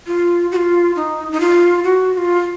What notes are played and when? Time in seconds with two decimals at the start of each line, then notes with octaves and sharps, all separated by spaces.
0.07 F4
0.51 F#4
0.56 F4
0.96 D#4
1.32 D#4
1.40 F4
1.84 F#4
2.13 F#4
2.17 F4